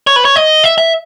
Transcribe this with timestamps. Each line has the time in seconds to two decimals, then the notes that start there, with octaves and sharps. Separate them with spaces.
0.07 C#5
0.16 B4
0.25 C#5
0.36 D#5
0.64 E5
0.78 E5